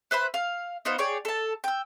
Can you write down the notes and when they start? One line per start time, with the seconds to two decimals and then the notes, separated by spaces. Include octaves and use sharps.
0.11 B4 C5 E5 B5
0.34 F5
0.85 B3 D#4 F4 C5
0.98 G#4 C#5 D5 G5
1.25 A4 A5
1.64 G5 E6